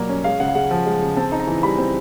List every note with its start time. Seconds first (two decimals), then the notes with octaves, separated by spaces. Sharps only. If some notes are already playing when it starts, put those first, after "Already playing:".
Already playing: B2 F#3 A#3 D5
0.09 C#4
0.24 G#3 F5
0.40 C#3 F#5
0.48 F5
0.55 C#3 F#5
0.71 F3
0.86 G#3
1.02 C#3
1.17 C4 A5
1.32 D#4
1.40 A#5
1.47 E3
1.63 G3 B5
1.78 C4